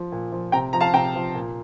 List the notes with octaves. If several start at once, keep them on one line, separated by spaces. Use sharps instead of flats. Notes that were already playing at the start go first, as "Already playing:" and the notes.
Already playing: F3
A#2
F3
C3 G5 A#5
F3 A#5
F5 A5
C3 G5 A#5
F3
A#2